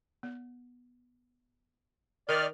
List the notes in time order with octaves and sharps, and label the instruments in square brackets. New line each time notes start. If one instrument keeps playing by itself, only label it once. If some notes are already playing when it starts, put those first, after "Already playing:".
[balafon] B3
[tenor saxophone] D#3 [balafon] A#4 [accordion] D5 F6